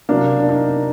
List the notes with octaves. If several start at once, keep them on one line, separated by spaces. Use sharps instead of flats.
C3 F#3 A#3 D4
D4
D#4